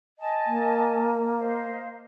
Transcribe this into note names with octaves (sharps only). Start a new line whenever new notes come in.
D#5 G#5 A5
A#3
C5 D#5 F5